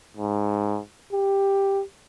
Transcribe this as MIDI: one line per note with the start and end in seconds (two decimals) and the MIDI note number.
0.17 0.79 44
1.13 1.83 67